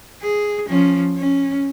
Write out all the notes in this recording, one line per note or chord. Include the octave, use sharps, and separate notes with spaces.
G#4
F3 C#4
C#4